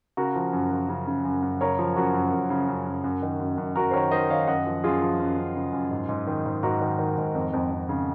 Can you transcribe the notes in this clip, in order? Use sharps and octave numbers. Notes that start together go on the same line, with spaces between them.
C#3 F#4 A#4
F3
F#2
F3
C#3
C#3
F#2
F#2
C#3 A#4 C#5
F3
F#2 F#4 A#4
F#2
F#2
C#3
F#2
F#2
F#2
D#3
F#2
F#2
F#2 F#4 A#4
C5
D#3 A#4 C#5
D#3 C5 D#5
D#3 C#5 F5
F#2 D#5 F#5
F3
F#2 F4 G#4
F3
F#2
F#2
C#3
F#2
G#2
G#2
D#3
G#2
G#2 F#4 A#4
D#3
D#3
G#2
F2
F2
F2
C#3